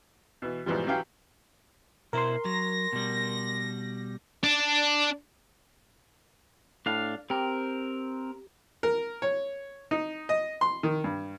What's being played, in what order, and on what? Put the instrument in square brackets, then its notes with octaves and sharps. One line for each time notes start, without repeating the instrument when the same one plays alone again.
[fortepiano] B2 E3
G#2 B2 E3 F3 G3
E3 F#3 C#4 G4 F5 G5
[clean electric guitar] B2 E4 C5 [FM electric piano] A#4 C6
[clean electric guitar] F#3 [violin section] A#6
[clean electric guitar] B2 G3
[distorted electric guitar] D4
[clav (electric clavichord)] A2 [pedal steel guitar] D4 F5
[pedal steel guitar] C4 A#4 [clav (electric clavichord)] G4
[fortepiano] A#4
C#5
D#4
D#5
C6
D#3
G2